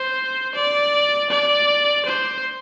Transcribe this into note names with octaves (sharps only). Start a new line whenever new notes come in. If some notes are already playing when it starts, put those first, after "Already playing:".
Already playing: C5
D5
D5
C5